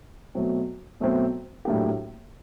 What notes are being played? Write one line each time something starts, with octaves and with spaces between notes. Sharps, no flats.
B2 F#3 A3 C4
B2 F#3 A3 C4
A2 F#3 A#3 D4 G4